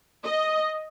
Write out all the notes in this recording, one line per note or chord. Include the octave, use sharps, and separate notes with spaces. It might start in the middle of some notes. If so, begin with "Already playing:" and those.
D#5